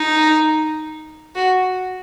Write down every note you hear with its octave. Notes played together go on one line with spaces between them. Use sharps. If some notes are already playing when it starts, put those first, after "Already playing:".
Already playing: D#4
F#4